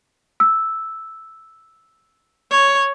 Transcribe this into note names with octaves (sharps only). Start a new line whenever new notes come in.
E6
C#5